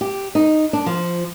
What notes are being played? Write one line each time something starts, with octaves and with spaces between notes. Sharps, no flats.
G4
D#4
D4
F3